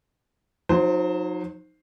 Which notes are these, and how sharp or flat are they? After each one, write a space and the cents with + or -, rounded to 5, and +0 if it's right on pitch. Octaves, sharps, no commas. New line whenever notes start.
F#3 -40 D#4 +0 C5 +0